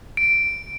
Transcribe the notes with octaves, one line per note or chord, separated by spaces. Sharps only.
D7